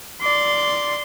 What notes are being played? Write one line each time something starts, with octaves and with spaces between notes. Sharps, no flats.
D5 C6